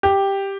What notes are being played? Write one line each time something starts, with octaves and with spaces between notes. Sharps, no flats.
G4